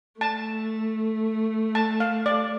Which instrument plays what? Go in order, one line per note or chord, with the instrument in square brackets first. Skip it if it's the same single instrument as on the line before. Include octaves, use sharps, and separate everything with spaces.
[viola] A3 [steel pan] A5
[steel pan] A5
F5
D5